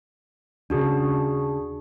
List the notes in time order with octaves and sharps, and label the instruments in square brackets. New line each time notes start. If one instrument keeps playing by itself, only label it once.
[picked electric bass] D#2 C#3 [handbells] D4 F#4 G#4